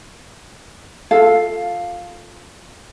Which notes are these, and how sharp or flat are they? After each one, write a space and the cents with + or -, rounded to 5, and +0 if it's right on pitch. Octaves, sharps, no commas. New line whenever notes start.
F4 +15 A4 +0 F5 +5